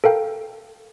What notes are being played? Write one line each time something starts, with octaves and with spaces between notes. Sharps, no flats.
A4 A#4 F5 G5